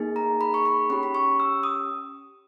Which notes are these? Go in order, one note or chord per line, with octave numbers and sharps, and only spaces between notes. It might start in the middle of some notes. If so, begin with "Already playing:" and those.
Already playing: A#3 D#4 G#4
A#5
B5
C#6
B5
C#4 G4 B5
B5
C#6
E6
D#6